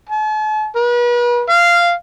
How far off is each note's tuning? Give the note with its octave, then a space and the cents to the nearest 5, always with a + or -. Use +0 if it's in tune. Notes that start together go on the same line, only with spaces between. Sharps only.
A5 -45
B4 -40
F5 -10